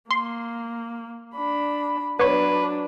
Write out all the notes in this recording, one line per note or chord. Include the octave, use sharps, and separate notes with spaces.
A#3 C6
D4 B5
F#3 B3 D4 B4 C#5